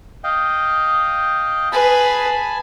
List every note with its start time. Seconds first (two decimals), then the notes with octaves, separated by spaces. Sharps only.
0.24 D#5 F5 G5
1.72 G#4 B4 G#5 A5 B5